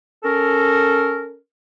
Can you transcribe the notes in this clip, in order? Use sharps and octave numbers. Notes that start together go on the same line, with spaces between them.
C#4 A4 A#4